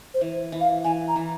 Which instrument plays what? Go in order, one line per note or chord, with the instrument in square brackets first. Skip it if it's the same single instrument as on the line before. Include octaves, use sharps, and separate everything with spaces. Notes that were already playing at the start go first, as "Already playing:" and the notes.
[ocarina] C5
[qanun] E3
E3
[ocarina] F5
[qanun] E3 [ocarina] G#5
[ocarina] A#5
[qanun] E3